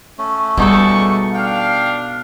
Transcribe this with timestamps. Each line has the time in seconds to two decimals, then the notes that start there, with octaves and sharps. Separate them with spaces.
0.18 A3 C#4
0.57 B2 G3 G#3 D#4 A4 D5 C#6
1.34 D4 F5 G5